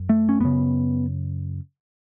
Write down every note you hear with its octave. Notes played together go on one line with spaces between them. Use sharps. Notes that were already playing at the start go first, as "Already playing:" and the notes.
Already playing: F#2
A3
C#4
F#2 C#3 B3